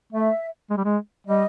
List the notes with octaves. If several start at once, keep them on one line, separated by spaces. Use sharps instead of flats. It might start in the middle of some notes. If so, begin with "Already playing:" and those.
A3 E5
G#3
G3
G#3
G3 D#5